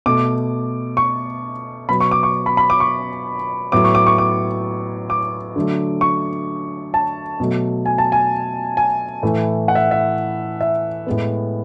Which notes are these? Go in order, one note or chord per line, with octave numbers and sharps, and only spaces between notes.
B2 A3 D6
C#6
B2 F#3 B3 B5
C#6
D6
C#6
B5
B5
D6
C#6
A2 F#3 B3 D6
C#6
D6
C#6
D6
D6
D3 F#3 A3
C#6
A5
B2 F#3 A3
G#5
A5
G#5
G#5
A2 E3 A3
F#5
E5
E5
E5
A2 G#3 B3